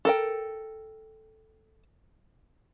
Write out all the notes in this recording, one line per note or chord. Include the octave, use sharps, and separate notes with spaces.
A4 A#4 G5